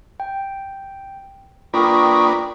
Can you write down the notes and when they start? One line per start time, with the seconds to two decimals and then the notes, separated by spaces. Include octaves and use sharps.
0.20 G5
1.74 A#3 D4 F4 A#4 B4 G5 C#6 D#6